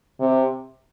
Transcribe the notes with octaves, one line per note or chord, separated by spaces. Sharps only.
C3